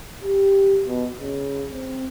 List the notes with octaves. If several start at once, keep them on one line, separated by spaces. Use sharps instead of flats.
G4
B2
C#3
C4